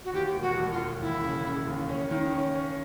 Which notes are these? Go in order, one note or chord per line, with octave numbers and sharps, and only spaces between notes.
F#4
D#2 G4
E1
F#4
E1
F4
E1
D#2 E4
C#3
C#3
D#2
C#4
D#3
C#4
C#4